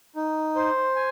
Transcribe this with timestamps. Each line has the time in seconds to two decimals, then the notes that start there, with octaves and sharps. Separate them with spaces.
0.16 D#4
0.55 C5
0.96 G#5